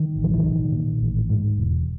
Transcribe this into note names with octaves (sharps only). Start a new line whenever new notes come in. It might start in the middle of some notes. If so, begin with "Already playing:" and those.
Already playing: D#3
A1
F3
E3
B1 D#3
A#2
A1
G#2
E1